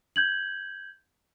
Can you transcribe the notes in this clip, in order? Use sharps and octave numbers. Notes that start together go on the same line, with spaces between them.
G6 G#6 F#7